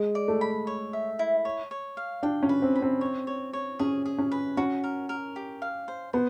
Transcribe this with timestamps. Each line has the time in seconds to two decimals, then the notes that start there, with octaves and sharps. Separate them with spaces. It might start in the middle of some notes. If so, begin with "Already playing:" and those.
Already playing: G#3
0.15 D5
0.28 A3
0.41 B5
0.67 C#5
0.93 E5
1.19 E4
1.45 C#5
1.71 C#5
1.97 F5
2.23 D4 G5
2.43 C#4
2.49 B4
2.62 C4
2.76 B5
2.82 C4
3.01 C#5
3.27 C#5
3.53 C#5
3.79 C#4 G#4
4.05 G#4
4.18 C#4
4.31 B4
4.57 C#4 F#4
4.84 A#4
5.09 A#4
5.36 G4
5.62 F5
5.88 C5
6.13 B3 C5